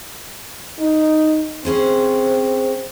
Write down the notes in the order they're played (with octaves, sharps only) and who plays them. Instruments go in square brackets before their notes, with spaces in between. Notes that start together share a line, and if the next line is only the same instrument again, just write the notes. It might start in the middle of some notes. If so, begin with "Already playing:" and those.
[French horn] D#4
[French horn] C4 [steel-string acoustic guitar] C#4 G#4 C5